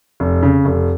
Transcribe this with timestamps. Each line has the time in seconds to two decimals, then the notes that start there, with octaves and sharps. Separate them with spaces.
0.20 F1
0.42 C#3
0.65 F1